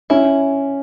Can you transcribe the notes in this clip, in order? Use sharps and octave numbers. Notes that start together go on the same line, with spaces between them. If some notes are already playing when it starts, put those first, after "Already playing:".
C#4 E4